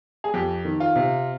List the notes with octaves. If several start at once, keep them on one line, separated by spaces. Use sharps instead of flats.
G#4
F2 G4
D#3
F4
C3